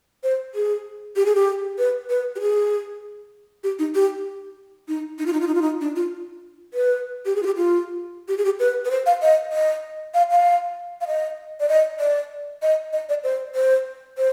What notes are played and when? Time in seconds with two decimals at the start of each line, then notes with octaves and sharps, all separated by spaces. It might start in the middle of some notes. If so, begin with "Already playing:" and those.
0.23 C5
0.55 G#4
1.16 G4
1.26 G#4
1.35 G4
1.78 B4
2.09 B4
2.36 G4
2.40 G#4
3.64 G4
3.79 D#4
3.95 G4
4.88 D#4
5.18 D#4
5.26 F4
5.33 D#4
5.41 F4
5.47 D#4
5.54 F4
5.62 D#4
5.81 D4
5.96 F4
6.74 B4
7.25 G4
7.36 G#4
7.42 F4
7.46 G4
7.56 F4
8.28 G4
8.37 G#4
8.45 G4
8.59 B4
8.85 B4
8.90 C5
9.06 F5
9.22 D#5
9.52 D#5
10.14 F5
10.31 F5
11.01 F5
11.07 D#5
11.60 D5
11.69 D#5
12.00 D5
12.62 D#5
12.93 D#5
13.09 D5
13.24 C5
13.55 C5
14.17 C5